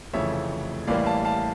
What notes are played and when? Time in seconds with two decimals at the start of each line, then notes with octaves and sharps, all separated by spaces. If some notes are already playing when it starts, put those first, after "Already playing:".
0.13 F1 F2 C#3 E3 A3 C#5 E5
0.87 A1 A2 E3 G3 A#3 D5 F5
1.06 F5 A5
1.25 F5 A5